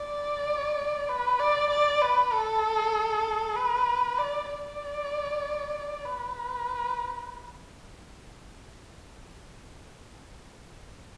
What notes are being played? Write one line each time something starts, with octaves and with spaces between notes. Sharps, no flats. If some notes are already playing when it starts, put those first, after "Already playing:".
Already playing: D5
B4
D5
D5
B4
A4
B4
D5
D5
B4